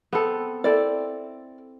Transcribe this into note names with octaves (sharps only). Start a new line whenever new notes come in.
B3 C4 A4
C4 E4 A4 D5